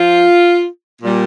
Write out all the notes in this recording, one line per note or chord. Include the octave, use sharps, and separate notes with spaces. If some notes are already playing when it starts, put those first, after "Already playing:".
Already playing: F3 F4
A#2 G3